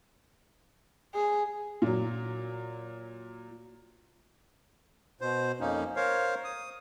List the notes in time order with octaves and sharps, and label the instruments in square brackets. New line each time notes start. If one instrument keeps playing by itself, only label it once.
[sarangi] G#4
[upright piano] A#2 F#3
[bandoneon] B2 C5
F2 A#3 C#4 D#4
A#4 C5 C#5 F5
D#6